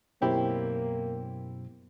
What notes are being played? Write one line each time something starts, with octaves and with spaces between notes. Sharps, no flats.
F#2 B2 A#3 C4 E4 G4